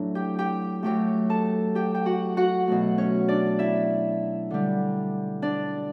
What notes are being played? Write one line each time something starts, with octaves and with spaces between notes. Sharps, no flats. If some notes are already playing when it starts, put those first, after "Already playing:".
Already playing: A2 F#3 A3 D4 E4
G4 G5
G4 G5
A2 F#3 A3 G4 G5
A4 A5
G4 G5
G5
F#4 F#5
F#4 F#5
B2 F#3 A3
C#4 C#5
D4 D5
E4 E5
D3 G3
D4 D5